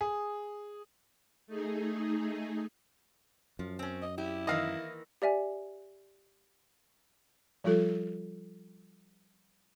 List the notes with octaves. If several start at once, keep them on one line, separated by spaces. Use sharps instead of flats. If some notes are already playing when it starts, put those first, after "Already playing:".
G#4
A3 D#4 G#4
F#2 F3
C4 C#4
D#5
E4 G4
D#3 E3 A#3 D#5 F5
G4 D5 E5 G#5
F3 G3 F4 A4